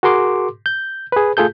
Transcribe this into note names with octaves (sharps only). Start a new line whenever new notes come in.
F#4 G#4 A#4 C6 D6
G6
G#4 B4
A3 F4 G#4 A4 G6